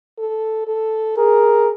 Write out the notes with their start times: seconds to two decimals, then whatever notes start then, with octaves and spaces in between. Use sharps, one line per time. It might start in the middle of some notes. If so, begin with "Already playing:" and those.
0.18 A4
0.68 A4
1.18 G#4 A#4